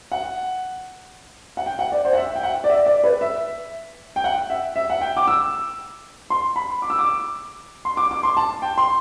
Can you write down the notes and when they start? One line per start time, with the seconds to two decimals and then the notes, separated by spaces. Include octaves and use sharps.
0.12 F#5
1.57 F#5
1.66 G5
1.79 F#5
1.92 D5
2.05 C5
2.13 F#5
2.18 E5
2.36 G5
2.43 F#5
2.64 D5
2.70 E5
2.86 D5
3.04 B4
3.21 E5
4.16 G5
4.24 F#5
4.50 E5
4.76 E5
4.90 F#5
5.01 G5
5.17 D6
5.28 E6
6.30 C6
6.56 B5
6.82 D6
6.90 E6
6.99 D6
7.85 C6
7.97 D6
8.11 D6
8.23 C6
8.37 A5
8.62 G5
8.78 C6